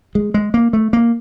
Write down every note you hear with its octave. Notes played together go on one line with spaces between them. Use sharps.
G#3
G#3
A#3
A3
A#3